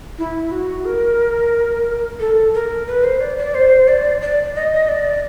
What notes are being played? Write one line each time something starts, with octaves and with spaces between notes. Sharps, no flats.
E4
F#4
A#4
A4
A#4
B4
C5
D5
D5
C5
D5
D5
D#5
D5